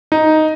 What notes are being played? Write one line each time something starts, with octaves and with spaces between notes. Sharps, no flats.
D#4